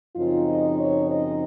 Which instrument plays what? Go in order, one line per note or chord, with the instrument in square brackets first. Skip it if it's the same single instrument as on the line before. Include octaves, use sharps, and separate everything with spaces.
[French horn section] F#2 C#3 F3 C4 D#4 F4
D#5
C#5
D#5